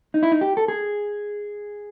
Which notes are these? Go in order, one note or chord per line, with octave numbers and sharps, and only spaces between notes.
D#4
E4
D#4
G4
A4
G#4